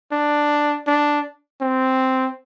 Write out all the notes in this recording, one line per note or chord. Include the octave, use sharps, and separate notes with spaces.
D4
D4
C4